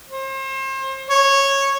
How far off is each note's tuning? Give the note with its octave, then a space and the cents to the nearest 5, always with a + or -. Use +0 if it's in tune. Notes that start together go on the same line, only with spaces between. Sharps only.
C5 +35
C#5 -10